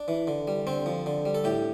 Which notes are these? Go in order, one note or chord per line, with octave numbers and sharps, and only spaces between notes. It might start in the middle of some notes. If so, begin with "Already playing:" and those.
Already playing: D4
E3
D3
G3
D3 C4
F3
D3
G3
A4
A2 G4